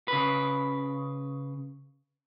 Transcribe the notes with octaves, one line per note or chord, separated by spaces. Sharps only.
C#3 B4